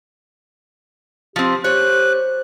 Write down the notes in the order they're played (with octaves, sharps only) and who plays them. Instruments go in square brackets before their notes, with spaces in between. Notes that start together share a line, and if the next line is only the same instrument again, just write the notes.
[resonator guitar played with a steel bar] F3 C4 [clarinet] G4
[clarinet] G4 [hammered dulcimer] C5 [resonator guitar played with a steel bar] C#5 [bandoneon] F#6